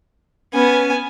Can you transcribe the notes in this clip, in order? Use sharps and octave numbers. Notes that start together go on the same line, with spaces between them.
B3 C#4 G#5